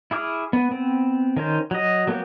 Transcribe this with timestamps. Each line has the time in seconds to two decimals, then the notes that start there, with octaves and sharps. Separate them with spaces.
0.11 E4 G#4 D6 F6
0.53 B3
0.71 B3 C4
1.37 D#3 C#4 C5
1.71 F#3 D#5
2.07 F#3 A#3 B3 F#4 G4